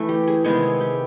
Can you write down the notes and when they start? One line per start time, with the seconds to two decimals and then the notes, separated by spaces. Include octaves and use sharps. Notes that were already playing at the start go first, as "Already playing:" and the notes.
Already playing: E3 A3
0.09 G4
0.27 G#4
0.44 C3 D#3 G#3 B3 G#4
0.63 G#4
0.81 G4